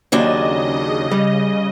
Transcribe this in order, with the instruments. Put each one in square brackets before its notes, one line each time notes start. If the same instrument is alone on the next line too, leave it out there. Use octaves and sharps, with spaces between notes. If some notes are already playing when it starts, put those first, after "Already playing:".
[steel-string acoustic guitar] D#2 F#3 D4 [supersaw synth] C#3 D#5
[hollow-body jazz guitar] G3